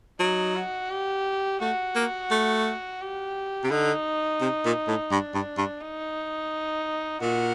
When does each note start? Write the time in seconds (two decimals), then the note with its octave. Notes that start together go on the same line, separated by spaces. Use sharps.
0.20 F#3 D#4
0.55 F#4
0.91 G4
1.61 A3 F#4
1.95 A#3
2.31 A3
3.01 G4
3.64 C3
3.71 D3 D#4
4.41 C3
4.65 A#2
4.88 A2
5.11 G2 D4
5.34 G2
5.58 G2
5.81 D#4
7.21 A#2 F#4